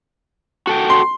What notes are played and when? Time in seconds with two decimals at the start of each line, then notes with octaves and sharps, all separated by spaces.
0.67 F#4 A4 G5
0.90 C6